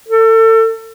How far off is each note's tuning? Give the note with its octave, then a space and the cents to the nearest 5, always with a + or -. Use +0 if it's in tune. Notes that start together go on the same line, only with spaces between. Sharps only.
A4 +30